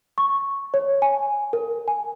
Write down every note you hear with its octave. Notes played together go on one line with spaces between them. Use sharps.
C#6
C#5
G#5
A#4
G#5